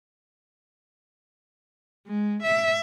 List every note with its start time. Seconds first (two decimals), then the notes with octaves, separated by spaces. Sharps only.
2.07 G#3
2.43 E5